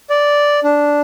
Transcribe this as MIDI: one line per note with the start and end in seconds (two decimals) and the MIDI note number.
0.10 0.60 74
0.64 1.01 62